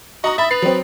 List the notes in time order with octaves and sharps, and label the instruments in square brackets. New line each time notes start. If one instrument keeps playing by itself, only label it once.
[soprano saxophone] F#4 [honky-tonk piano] D#5 A#5 D#6
[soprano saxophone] E5 [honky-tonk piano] B5 A6
[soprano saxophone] B4 [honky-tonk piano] C7 F7
[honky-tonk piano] F#3 C4